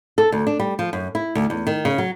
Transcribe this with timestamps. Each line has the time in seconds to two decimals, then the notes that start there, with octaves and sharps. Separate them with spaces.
0.18 A4
0.32 D2
0.47 D4
0.60 G3
0.79 F3
0.93 F#2
1.15 E4
1.35 D2
1.50 E2
1.67 D#3
1.85 C#3
1.98 F#3